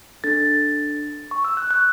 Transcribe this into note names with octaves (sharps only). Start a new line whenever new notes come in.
D4 A4 A6
C#6
E6
F#6
F#6